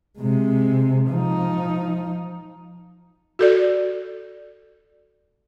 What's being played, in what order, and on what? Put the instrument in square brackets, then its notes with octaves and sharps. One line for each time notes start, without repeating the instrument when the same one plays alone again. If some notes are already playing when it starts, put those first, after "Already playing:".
[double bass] C3 G#3
F3 D#4
[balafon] F#4 A4 D5